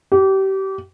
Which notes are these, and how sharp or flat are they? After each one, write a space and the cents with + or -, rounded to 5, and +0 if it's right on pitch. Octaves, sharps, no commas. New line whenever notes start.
G4 -30